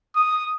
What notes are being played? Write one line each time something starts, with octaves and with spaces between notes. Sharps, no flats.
D#6